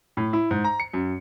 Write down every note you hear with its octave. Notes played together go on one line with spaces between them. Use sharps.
A2
E4
G#2
A#5
C#7
F#2